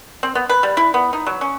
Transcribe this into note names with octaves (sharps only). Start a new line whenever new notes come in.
C4
B3
B4
G3
E4
B3
D#4
F#3
C#4